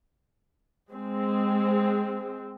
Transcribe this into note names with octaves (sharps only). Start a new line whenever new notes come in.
G#3 C4